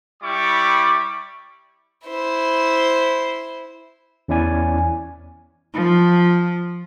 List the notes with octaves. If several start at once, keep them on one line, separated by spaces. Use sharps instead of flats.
G3 E4 C#6 D6
E4 C5
E2 C#4 E4 D5 G#5
F3